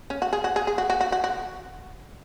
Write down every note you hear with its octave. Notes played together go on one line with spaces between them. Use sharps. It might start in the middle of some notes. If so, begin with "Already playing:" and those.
C#4
F#4
G#4
F#4
G#4
G#4
F#4
F#4
F#4
F#4
F#4